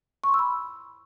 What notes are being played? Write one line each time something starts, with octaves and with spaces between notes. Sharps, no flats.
C#6
C6
E6
B5